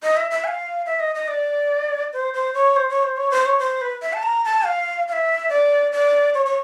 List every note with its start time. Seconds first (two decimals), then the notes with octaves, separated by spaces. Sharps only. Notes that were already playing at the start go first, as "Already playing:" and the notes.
0.03 D#5
0.17 E5
0.31 E5
0.44 G#5
0.48 F5
0.86 E5
1.00 D#5
1.15 D#5
1.28 D5
2.13 C5
2.34 C5
2.54 C#5
2.76 C5
2.89 C#5
3.03 C5
3.17 C#5
3.31 C5
3.46 C#5
3.59 C5
3.81 B4
4.02 E5
4.13 A5
4.23 A#5
4.45 A5
4.65 F5
5.08 F5
5.12 E5
5.49 D5
5.92 D5
6.34 C#5
6.46 C#5